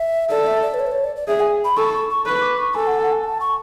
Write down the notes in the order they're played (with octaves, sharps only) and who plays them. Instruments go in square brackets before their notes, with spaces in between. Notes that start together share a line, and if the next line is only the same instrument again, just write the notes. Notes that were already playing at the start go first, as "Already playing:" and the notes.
Already playing: [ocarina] E5
[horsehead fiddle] A4 [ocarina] D5
[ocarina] E5
D5
B4
C#5
B4
C#5
D5
D5
[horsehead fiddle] G#4 [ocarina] E5
[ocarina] G#5
B5
[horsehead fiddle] A4 [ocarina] C#6
[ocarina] C#6
C#6
[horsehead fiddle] B4 [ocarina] C#6
[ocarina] D6
C#6
[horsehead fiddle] A4 [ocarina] G#5
[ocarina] F#5
F#5
G#5
A5
C#6